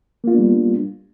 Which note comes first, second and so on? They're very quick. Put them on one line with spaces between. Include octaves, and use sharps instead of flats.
A#3 F4 B3 D4 G3